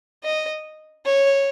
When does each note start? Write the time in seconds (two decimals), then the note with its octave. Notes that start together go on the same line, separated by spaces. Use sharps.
0.24 D#5
1.05 C#5